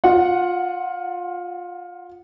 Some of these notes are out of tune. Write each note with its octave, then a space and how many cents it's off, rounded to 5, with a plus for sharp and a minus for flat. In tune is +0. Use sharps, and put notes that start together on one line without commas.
F4 +20 F#5 -5